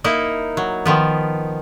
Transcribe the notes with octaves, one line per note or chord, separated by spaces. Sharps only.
A#3 D#4 E4
F#3
D#3 F3 B3